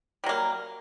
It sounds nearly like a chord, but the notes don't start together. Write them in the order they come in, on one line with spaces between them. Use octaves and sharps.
G3 F#3 A#3